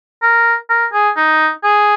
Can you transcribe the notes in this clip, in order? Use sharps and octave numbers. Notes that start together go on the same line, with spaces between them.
A#4
A#4
G#4
D#4
G#4